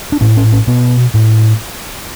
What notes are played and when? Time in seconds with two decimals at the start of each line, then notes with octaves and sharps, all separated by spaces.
0.12 D4
0.21 A2 C#4
0.37 C#4
0.52 C#4
0.67 B2 B3
1.14 A2